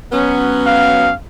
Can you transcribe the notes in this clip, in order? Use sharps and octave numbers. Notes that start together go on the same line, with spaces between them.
F#3 B3 C#4
F5